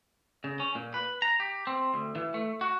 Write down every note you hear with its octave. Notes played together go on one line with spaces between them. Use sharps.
C#3
C#4
A#2
B4
A#5
G4
C4
D2
E3
A3
F#4